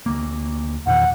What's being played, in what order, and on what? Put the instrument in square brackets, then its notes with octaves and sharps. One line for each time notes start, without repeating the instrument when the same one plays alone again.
[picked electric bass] D2 A#3
[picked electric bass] E2 A#2 D#3 [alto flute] F#5